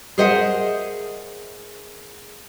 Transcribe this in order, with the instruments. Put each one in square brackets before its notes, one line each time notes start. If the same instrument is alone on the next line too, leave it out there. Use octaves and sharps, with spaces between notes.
[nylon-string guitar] G#4 A#4 C5 D#5 E5 F#5